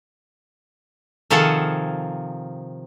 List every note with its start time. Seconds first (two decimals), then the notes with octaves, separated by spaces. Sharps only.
1.30 C3 D#3 F3 G#4 A4 F#5